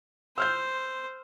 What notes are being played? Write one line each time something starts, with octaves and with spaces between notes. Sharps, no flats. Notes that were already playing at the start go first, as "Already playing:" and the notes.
C5 E6 F6 G6